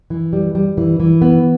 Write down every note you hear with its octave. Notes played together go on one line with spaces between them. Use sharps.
E3
G3
G3
E3
E3
B3